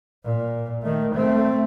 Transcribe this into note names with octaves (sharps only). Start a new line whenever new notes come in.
A#2
D#3 A3
A3 C4